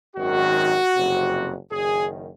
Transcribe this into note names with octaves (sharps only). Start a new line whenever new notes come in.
G#1 F#2 D#3 F#4
F#1 F2 C3
F#1 F#2 D#3 G#4